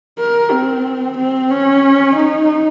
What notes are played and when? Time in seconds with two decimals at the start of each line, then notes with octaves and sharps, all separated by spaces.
0.19 A#4
0.51 C4
1.18 C4
1.51 C#4
2.16 D#4